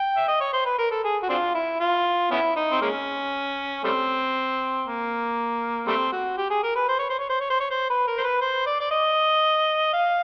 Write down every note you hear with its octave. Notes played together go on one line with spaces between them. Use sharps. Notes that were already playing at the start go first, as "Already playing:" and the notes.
Already playing: G5
E5
D#5
C#5
C5
B4
A#4
A4
G#4
F#4
C4 D4 F4
E4
F4
B3 C#4 E4
D#4
C4
G#3 A#3 C#4
G3 A3 C4
A#3
G3 A3 C4
F#4
G4
G#4
A#4
B4
C5
C#5
C5
C#5
C5
C#5
C5
C#5
C5
B4
A#4
C5
B4
C5
D5
D5
D#5
F5